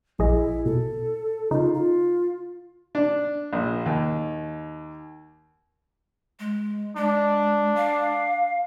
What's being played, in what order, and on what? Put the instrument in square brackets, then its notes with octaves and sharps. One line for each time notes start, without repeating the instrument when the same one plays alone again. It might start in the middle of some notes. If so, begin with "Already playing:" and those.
[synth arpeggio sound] A#1 G#4 D#5 [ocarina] E4
[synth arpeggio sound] B2 [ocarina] A4
[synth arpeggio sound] C#3 D#4 [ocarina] F4
[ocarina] F4
[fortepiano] D4
A#1
D#2
[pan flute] G#3
[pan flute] G#3 [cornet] D4
[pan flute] F5